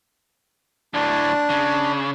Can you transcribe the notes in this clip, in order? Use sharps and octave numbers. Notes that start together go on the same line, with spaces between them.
D2 A2 D4
C#3